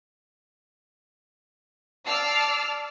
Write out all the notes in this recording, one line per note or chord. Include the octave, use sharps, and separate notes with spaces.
D5 A5 D6 E6 F6 C7